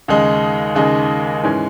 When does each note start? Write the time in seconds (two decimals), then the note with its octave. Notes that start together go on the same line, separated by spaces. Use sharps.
0.08 D#2 C#3 G#3 D#4
0.75 D#2 C#3 G#3 D#4
1.43 G#2 E3 G#3 C#4